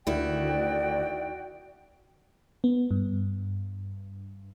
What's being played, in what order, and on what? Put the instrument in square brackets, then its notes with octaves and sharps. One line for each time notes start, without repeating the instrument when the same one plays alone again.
[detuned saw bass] D2 [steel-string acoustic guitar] D#3 E4 [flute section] F#4 G5 [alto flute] D5
[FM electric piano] B3
G2